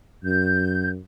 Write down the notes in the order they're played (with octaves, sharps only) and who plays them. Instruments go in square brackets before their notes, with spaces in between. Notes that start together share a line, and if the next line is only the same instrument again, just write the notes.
[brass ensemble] F#2 [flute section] G6